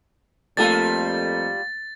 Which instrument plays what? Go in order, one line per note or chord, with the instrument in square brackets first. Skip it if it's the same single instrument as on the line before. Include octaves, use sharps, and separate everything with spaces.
[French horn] F2 [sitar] G3 F4 [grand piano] A3 A#3 A4 [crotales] A6